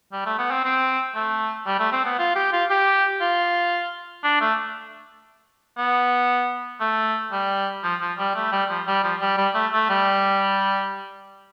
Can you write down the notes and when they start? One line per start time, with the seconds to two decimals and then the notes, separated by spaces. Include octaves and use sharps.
0.12 G3
0.26 A3
0.39 B3
0.51 C4
0.64 C4
1.16 A3
1.67 G3
1.79 A3
1.92 C4
2.05 B3
2.19 F4
2.36 G4
2.53 F4
2.70 G4
3.21 F4
4.24 D4
4.41 A3
5.78 B3
6.81 A3
7.32 G3
7.83 F3
8.01 F3
8.19 G3
8.35 A3
8.52 G3
8.70 F3
8.87 G3
9.03 F3
9.21 G3
9.38 G3
9.55 A3
9.72 A3
9.90 G3